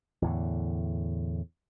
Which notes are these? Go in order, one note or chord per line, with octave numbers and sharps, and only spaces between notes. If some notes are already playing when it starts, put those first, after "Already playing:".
E2 A2 D3